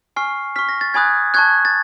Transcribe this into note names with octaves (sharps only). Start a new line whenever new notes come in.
G#5 C#6 F6 C7
C#6 F6 B6
A#6
A6
G#5 B5 D#6 F#6 G#6
A5 C#6 F#6 G#6
A6